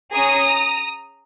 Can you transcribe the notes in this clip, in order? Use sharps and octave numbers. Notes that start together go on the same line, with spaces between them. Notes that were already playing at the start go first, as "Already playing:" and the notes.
C#4 G#4 A#5 D#6